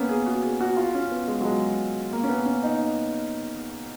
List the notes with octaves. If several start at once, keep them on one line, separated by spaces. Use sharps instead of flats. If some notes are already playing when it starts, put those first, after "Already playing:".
Already playing: A#3 B3 C#4
G#4
F#4
G#4
F#4
F4
C#4
B3
G#3
F#3
G#3
A#3
C#4
B3
C#4
D#4